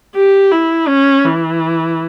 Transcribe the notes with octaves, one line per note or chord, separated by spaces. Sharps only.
G4
E4
C#4
E3